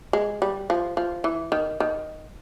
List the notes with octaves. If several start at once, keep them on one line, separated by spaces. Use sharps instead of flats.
G#3
G3
F3
F3
E3
D#3
D#3